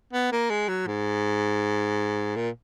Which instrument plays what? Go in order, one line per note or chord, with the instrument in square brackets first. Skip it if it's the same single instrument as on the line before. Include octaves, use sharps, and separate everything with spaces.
[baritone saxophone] B3
A#3
G#3
F#3
G#2
A#2